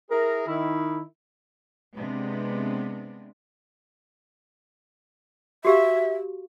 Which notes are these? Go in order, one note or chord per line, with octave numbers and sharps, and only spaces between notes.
E4 G#4 A#4
D#3 E4
C3 G#3 B3 D4
F#4 G4 E5 F5